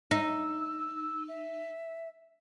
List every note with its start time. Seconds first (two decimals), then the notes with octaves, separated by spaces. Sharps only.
0.11 D#4 E6
1.28 E5